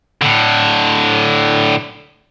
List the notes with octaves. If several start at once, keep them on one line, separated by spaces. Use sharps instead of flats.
A2 D3